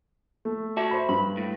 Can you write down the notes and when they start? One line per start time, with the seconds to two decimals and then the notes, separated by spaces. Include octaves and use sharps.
0.45 A3
0.77 F#4 E5 A5
0.91 C5 B5
1.09 G2 B5
1.37 A2